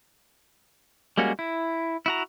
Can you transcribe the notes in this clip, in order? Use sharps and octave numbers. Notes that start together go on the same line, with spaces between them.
G3 G#3 A#3 C#4 F#4
E4
E4 F#4 A#5